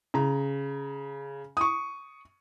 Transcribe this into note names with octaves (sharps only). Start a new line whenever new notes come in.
C#3 A#5
C#6 D#6